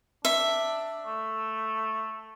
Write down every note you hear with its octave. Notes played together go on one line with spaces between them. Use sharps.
D4 E5
A3